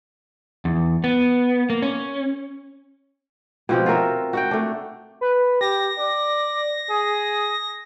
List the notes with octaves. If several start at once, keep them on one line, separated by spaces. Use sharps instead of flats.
E2
B3
A#3
C#4
B2 F3 C4 G4
F4 F#4 A#4 E5
F#4 F#5 G5
A3 D4
B4
G4 A#6
D5
G#4